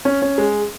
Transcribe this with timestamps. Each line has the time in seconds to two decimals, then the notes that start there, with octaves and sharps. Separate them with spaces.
0.05 C#4
0.22 C#4
0.38 G#3